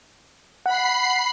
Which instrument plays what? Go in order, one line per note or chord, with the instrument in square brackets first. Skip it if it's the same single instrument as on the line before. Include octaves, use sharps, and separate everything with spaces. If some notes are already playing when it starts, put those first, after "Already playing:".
[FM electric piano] F#5 [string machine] B5 C7